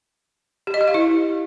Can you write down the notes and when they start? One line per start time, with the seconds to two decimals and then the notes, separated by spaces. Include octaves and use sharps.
0.67 G4
0.74 D#5
0.81 G4
0.88 F5
0.94 E4